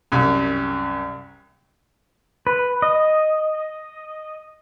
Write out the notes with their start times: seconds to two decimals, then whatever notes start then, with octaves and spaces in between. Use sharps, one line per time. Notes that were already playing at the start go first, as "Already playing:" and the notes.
0.12 C2 F#2
2.47 B4
2.82 D#5